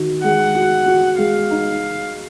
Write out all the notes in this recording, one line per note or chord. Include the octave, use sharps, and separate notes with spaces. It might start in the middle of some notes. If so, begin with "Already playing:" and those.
Already playing: D#3 F#4
G#3 F#5
F#4
F#4
G#3 F5
D#4